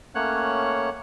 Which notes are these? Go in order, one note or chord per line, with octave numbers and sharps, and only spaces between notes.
A3 A#3 C#4 C#5 F#5 F#6